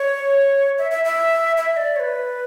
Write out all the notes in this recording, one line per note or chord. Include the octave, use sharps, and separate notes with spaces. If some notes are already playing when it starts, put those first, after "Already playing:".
Already playing: C#5
E5
E5
E5
E5
D5
C#5
B4